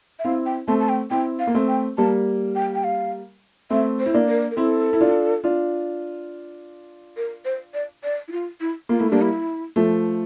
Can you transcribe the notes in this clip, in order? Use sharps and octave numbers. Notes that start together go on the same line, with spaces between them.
E5
C4 E4 F5
G5
A3 C4 A5
A5
G5
C4 E4 G5
F5
A#3
A3 C4
G5
G3 A#3 A5
G5
G5
F5
A3 C4 E5
C5
E4
A#3 D4
A#4
A#4
C4 E4 A4
E4
D4 F4
D4 F4
A#4
C5
D5
D5
E4
F4
E4
A#3 F4
A3 E4
G3 A#3 D4
E4
F3 A3